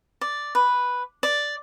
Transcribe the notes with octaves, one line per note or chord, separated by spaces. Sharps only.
D5
B4
D5